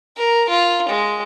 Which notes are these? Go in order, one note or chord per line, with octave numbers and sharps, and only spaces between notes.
A#4
F4
G#3